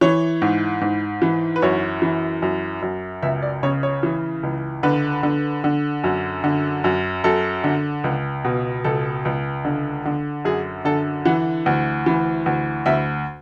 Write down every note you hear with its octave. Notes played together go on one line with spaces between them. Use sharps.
E3 C#5
G#2
G#2
E3
B4
F#2 C#5
E3
F#2
F#2
C#2 E5
D5
C#3 C#5
C#5
E3
C#2
D3 B4
D3
D3
F#2
D3
F#2
F#2 A4
D3
C#2
B2
C#2 A4
C#2
D3
D3
F#2 G#4
D3 A4
E3 F#5
D2
E3
D2
D2 E5